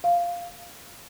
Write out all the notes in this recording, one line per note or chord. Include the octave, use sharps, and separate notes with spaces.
F5